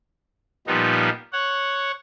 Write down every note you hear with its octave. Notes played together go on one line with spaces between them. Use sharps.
A#2 F3 G3 B3 D#4
C#5 F#5